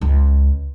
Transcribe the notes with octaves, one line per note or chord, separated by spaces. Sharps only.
C#2